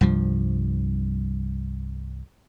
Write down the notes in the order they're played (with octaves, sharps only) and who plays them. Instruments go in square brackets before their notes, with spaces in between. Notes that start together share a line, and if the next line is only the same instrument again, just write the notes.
[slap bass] C2 G2 F3